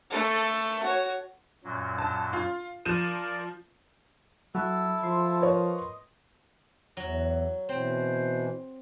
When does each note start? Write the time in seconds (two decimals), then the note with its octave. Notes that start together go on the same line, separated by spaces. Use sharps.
0.10 A3 A4
0.83 F#4 C#5
1.64 F#2 A#2 F#3
1.98 A5
2.33 F4
2.85 F3 A#4 D5 D#7 E7
4.55 F#3 E4 A4
5.03 F3 C6
5.42 A#4 B4 C#5 D#5
6.97 E2 F#3
7.69 B2 E3 C4 C5